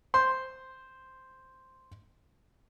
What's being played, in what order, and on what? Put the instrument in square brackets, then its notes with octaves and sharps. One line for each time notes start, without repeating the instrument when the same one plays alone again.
[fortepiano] C5 C6